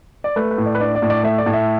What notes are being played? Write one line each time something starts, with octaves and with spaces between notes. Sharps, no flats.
D5
A3 B4
B4
A2
D5
B4
D4 D5
D5
A2
D5
A3 E5
D5
A2
E5